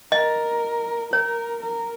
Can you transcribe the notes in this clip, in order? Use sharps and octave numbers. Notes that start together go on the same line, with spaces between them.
A#4 D#5
A#4 C#5
A#4